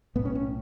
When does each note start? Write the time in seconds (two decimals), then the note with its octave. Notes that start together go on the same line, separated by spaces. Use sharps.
0.15 B1 A2 B3
0.25 C#4
0.35 C#4